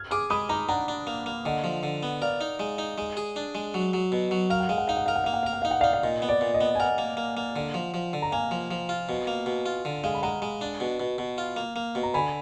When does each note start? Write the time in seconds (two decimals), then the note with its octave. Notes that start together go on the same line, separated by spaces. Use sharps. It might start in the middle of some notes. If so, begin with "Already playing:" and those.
Already playing: F6 G#6
0.11 G#4 D6 F6
0.30 G#3 B5 D#6
0.49 D#4 A#5 D6
0.69 D4 F#5 A#5
0.88 D4
1.07 A#3
1.26 A#3
1.45 D3 D#5 F#5
1.64 F3
1.83 D3
2.03 B3
2.22 A#4 D5 F5
2.41 D#4
2.60 G#3
2.78 D#4
2.98 G#3
3.17 G#4
3.36 D4
3.55 G#3
3.74 F#3
3.93 F#3
4.12 B2
4.31 F#3
4.50 A#4 F5
4.60 F#5
4.69 G#3 F5
4.78 F#5
4.88 D#4 F5
4.97 F#5
5.06 A#4 F5
5.15 F#5
5.24 A#3 F5
5.33 F#5
5.43 A#4 F5
5.53 F#5
5.62 D#4 F5
5.71 F#5
5.80 D#4 D5 F5
5.93 F5
6.03 A#2 D#5
6.22 B3
6.28 D5
6.41 A#2
6.54 D#5
6.61 B3
6.75 G#5
6.79 A#4 D#5 F#5
6.98 A#3
7.17 A#3
7.37 A#3
7.56 D3
7.74 F3
7.94 F3
8.13 D3
8.22 A#5
8.32 A#3 F5 G#5
8.51 F3
8.71 F3
8.89 F4
9.09 B2
9.27 A#3
9.46 B2
9.66 F4
9.85 D3
10.04 G#3 F5 G#5
10.15 B5
10.23 G#3 F#5 A#5
10.42 G#3
10.61 D4
10.80 B2
11.00 B2
11.18 B2
11.38 F4
11.57 A#3
11.76 A#3
11.95 B2
12.03 A#5
12.14 D3 G#5 B5